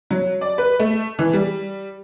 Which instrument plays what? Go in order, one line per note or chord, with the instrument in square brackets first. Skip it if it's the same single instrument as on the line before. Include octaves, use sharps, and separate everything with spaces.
[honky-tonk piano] F#3
D5
B4
A3
E3
G3